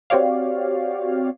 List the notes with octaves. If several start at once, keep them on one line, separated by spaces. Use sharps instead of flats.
C4 F#4 G4 C#5 D5 F5